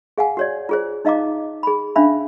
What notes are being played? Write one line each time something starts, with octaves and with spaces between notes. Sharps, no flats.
G#4 F5 F#5 G#5
F#4 C#5 D5
F4 G#4 C5
D#4 D#5 F5 A#5 D6
G#4 B5
C#4 D4 E5 F5 B5